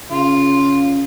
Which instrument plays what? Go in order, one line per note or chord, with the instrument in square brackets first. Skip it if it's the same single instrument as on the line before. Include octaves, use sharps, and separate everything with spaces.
[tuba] C#3 [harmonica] F4